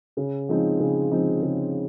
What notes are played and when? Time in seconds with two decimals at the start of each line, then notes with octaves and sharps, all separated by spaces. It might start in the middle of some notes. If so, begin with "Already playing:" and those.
0.17 C#3
0.49 F3 G#3 C4 D#4
0.80 C#3
1.11 F3 G#3 C4 D#4
1.42 C#3